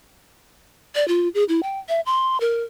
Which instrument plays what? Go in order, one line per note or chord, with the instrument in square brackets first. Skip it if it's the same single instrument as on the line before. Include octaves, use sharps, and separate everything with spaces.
[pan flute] D5
F4
G#4
E4
G5
E5
C6
A#4